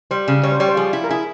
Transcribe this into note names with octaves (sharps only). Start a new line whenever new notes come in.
G3 C5
C#3
G3 C#5
C5
G3 C#5
C5
F3 G#4
E4
A#4
E4 G#4